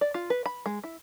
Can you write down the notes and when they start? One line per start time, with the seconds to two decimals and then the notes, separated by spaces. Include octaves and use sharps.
0.01 D5
0.14 F4
0.30 B4
0.46 B5
0.66 G#3
0.84 E4